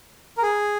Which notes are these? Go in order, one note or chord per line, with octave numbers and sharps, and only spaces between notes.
A#4
G#4